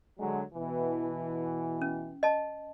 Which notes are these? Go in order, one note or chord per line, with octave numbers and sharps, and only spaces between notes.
D3 F#3 G#3
B2 E3
C#4
D#5 A5